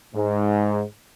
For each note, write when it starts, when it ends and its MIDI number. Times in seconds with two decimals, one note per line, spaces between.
0.14 0.82 44